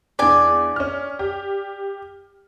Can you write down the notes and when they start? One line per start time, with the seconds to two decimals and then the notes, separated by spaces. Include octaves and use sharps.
0.19 E2 D4 D5 G#5
0.76 C#4 F6
1.19 G4